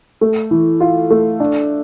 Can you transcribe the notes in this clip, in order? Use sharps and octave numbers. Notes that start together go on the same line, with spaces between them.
A3
E3
F4
A3
D4